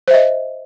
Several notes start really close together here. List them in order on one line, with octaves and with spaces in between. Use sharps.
C5 E5 D#5